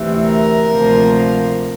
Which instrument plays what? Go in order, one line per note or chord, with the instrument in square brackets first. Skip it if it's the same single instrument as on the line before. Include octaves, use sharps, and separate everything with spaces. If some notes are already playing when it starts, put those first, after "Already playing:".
Already playing: [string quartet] D2 C3 E3
A#4
D2 C3 F3 A#3